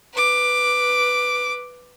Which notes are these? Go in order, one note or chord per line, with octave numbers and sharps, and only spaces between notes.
B4 D6